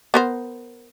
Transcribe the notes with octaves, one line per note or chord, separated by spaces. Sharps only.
B3 A#4 C5